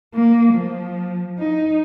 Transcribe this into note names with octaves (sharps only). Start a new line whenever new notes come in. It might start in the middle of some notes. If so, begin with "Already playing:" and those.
A#3
F3
D#4